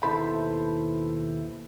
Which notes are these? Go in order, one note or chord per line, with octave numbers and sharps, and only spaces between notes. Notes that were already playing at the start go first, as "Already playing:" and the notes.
D#2 B2 E4 A4 C5 B5